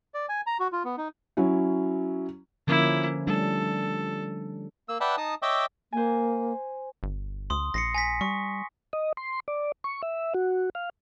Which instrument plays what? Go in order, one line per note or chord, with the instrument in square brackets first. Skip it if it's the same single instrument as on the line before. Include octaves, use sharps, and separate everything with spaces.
[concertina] D5
G#5
A#5
F#4
F4
B3
D#4
[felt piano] F#3 C#4 E4
[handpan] D3 F3 C#4 [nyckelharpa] A#3 E4
[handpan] G3 A3 D4 [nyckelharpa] A4
[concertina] A#3 E6
B4 D5 E5 F#5 G5 A5
D#4 A5 D#6
C#5 D#5 E5 G5 D6 E6
[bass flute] A#3 [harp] C5 G#5
[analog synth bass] G1
[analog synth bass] D2 [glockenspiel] C6 D#6
[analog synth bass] A#1 [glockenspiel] A#6 C7 C#7
[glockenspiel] G#5 A#6 B6
[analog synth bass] G3 [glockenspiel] C#6
[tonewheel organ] D#5
C6
D5
C#6
E5
F#4
F5